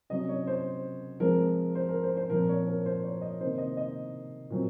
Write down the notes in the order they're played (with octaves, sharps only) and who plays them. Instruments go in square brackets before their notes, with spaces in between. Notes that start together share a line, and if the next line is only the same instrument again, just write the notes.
[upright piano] C3 F#3 C#4 D#5
C#5
C5
F3 G#3 C4 A#4
C5
A#4
C5
C5
A#2 F3 C4 A#4
C#5
A#4
C5
C#5
D#5
C3 D#3 A#3 C5
D#5
D#5
A#2 F#3 C4